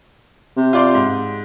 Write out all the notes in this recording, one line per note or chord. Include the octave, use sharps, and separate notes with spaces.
C3
F4 D5 C6
G#2